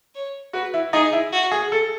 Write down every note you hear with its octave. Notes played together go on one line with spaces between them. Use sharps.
C#5
F#4 B4
E4
D#4 G#4
E4
F#4
G#4
A4